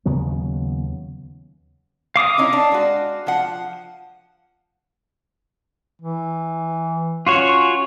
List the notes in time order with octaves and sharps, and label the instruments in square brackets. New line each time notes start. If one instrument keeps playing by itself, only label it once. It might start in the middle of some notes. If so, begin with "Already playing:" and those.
[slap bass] D#2 C#3 F#3 B3
[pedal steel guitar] F5 D6 D#6
[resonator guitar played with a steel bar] C#4 D#4 E4
D4
G#3 F#4
F3 F#5
[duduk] E3
[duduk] C#4 [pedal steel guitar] F4 F#4 C#5